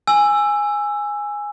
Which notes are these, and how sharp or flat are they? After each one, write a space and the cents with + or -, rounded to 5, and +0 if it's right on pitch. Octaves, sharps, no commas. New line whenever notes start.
G#5 -5 E6 +10